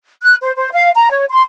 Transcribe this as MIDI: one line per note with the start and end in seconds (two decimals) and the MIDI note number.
0.23 0.35 90
0.43 0.52 72
0.57 0.69 72
0.73 0.90 77
0.95 1.09 82
1.10 1.25 73
1.29 1.43 84